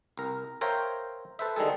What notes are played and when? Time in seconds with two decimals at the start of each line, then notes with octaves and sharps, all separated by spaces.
0.17 C2 A#4
0.61 A#4 C5 C#5 E5 F5 G5
1.39 A4 B4 C5 E5
1.56 D3 D#3 G3 G#3 G#4 A4